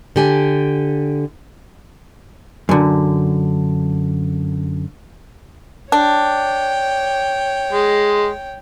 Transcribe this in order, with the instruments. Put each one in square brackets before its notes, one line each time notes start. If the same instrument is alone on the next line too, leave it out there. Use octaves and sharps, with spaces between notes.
[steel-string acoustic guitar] D3 G4 G#5
[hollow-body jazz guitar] F#2 D3
[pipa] D4 [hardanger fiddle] C#5 G5
[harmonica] G#3